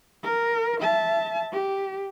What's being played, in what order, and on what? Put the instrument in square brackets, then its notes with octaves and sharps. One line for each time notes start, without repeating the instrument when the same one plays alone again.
[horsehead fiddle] A#4
E5 A5
G4